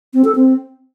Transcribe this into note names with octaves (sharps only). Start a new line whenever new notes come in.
C4
A4
C4